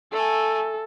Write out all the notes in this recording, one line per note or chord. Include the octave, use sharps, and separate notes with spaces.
A3 A4 G#5